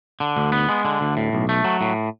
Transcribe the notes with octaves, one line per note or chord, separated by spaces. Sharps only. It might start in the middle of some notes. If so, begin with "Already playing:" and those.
D3
D2
B3
G#3
D3
D2
A2
B1
A3
F#3
A2